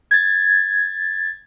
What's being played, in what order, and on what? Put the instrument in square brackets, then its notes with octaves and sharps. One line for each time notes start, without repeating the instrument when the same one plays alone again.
[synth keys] G#6 A6